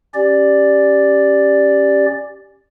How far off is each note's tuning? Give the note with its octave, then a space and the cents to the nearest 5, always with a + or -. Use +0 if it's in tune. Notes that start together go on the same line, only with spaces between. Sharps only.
C#4 -5 G4 +0 D5 +0